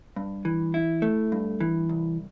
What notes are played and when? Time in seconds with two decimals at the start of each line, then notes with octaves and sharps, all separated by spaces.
0.16 G2
0.45 E3
0.74 E4
1.02 A3
1.32 G2
1.60 E3
1.89 C2